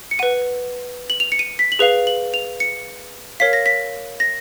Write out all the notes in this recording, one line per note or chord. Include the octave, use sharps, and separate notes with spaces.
C#7
B4 F#5 D#7
F#7
F7
C#7
D#7
B6
F#7
G#4 B4 F5 F7
F#7
F7
C#7
A#4 C#5 F5 B6
A#6
B6
A#6